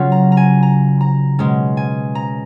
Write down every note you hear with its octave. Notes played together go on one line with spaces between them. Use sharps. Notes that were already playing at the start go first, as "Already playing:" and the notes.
Already playing: C#3 F#3 C#4 F4
A#5
A#5
G#5
A#5
A#5
B2 G#3 C#4
G#5
A#5